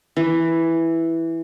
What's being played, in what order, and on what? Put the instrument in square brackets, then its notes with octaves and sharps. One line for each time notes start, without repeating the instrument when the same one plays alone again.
[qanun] E3